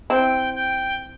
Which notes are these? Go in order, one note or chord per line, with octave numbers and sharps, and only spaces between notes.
C4 E4 G5
G5